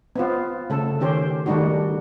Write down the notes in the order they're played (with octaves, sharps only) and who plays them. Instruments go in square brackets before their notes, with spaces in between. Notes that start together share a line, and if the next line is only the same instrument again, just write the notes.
[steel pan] B3 C4 F4
C#3 A3 A4
D#3 C#4 G4 C5
D#3 G3 A3 D4 D#4 F#4